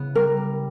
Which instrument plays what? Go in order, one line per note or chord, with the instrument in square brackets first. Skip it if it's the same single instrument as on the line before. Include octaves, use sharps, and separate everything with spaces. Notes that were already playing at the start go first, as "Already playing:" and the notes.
Already playing: [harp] C#3 B3 E4
[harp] G3 [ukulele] A#4